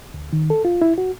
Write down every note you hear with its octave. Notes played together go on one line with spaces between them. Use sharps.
D2
D#3
A4
F4
E4
F#4